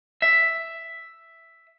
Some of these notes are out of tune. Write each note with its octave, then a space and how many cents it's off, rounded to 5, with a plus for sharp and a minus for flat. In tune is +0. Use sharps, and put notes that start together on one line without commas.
E5 +5